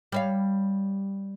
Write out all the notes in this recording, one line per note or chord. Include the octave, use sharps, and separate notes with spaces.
G3 C#5 F5